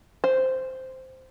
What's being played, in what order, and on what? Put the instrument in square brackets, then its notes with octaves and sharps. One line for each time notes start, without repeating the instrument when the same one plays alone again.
[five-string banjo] C5